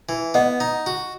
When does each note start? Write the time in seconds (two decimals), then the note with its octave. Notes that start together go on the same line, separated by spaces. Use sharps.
0.09 E3
0.34 B3 D#5 F#5
0.60 D#4
0.86 F#4